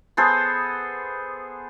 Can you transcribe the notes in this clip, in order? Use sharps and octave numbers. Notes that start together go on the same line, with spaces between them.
B3 G#4 A4 C5